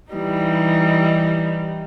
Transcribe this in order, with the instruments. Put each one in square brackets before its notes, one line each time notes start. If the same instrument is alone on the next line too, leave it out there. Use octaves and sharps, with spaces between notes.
[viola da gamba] E3 G3 D#4